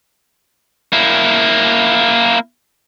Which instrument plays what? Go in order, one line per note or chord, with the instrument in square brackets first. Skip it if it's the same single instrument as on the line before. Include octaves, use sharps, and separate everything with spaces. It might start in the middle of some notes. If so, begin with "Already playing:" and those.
[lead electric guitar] A#3 E4